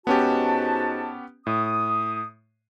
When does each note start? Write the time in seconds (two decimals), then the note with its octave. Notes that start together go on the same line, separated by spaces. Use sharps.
0.07 G#2 B3 C#4 F#4 G4 A5
1.47 A2 D#6